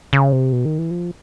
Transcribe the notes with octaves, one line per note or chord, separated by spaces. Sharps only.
C#3
C3
B2
D#3
E3
F3